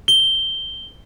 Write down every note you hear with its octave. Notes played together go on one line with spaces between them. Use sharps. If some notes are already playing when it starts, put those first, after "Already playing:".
G7